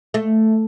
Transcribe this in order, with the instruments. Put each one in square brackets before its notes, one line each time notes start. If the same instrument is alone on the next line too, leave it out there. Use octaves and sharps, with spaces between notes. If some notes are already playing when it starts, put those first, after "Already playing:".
[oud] A3